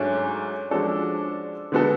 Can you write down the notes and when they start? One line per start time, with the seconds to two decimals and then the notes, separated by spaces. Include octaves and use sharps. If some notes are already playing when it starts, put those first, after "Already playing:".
Already playing: G#2 F#3 A3 C#4 D4
0.70 F3 G#3 C#4 D4 F#4 A4
1.72 D3 G#3 B3 F#4 A4